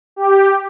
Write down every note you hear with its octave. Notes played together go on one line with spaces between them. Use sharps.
G4